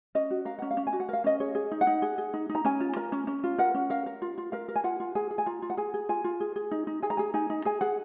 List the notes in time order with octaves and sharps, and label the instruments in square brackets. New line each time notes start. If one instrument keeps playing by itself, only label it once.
[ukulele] C#4 D#5
F#4
A#4 F5
C#4 F#5
F5
C#4
G#5
F#4
F#5
A#4 F5
C#4 D#5
G#4 C#5
G#4
D#4
F#5
D#4
G#4
G#4
D#4
D#4
A#5
C#4 G#5
F4
A#4 A#5
C#4
C#4
F4
A#4 F#5
C#4
A#4 F5
A#4
F4
F4
A#4 F5
A#4
G#5
F4 F#5
F4
G#4 G#5
G#4
G#5
F4 A#5
F4
F#5
G#4 G#5
G#4
F4 G#5
F4
G#4
G#4
D#4
D#4
G#4 G#5
A#5
G#4 G#5
D#4 G#5
D#4
G#4 G#5
G#4 F#5